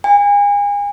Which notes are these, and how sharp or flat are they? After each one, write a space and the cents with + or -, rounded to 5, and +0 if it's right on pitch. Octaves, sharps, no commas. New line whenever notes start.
G#5 -35